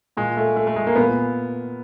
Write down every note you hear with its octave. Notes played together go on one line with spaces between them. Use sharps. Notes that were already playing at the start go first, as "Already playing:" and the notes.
A#2 G#3
A3
A3
A3
G#3
A#3
A#2 B3